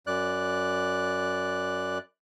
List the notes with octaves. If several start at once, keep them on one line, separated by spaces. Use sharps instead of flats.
F#2 D5 F#6